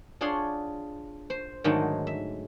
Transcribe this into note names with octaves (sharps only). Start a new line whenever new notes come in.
D4 F4 G#4 C#5 F#5 C6
C5
G#2 D3 D#3 F#3 G#3 A3
E5